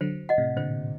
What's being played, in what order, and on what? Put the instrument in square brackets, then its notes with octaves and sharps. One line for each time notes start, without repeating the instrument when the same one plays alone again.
[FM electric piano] D3 F#3 [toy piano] C5
[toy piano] D#5 F#5
[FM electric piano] A2 C3
[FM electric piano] A#2 D3 [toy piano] C5